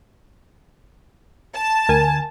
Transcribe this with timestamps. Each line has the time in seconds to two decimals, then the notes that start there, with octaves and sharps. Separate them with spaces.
1.54 A5
1.89 D2 A#4 G#5